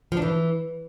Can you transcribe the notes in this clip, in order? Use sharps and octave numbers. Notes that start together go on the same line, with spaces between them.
F3
D4
E3